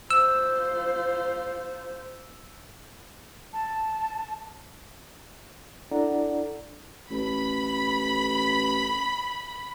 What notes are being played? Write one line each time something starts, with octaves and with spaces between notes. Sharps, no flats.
F4 C5 E6
A5
D4 E4 A4 D5 F#5 A#5
A1 B5